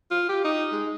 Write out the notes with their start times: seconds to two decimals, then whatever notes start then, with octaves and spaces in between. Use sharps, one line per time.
0.11 F4
0.29 G4
0.44 D#4
0.72 G#3